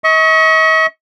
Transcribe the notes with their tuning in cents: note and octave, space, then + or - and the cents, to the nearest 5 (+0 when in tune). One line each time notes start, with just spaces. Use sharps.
D#5 +45 C#6 +0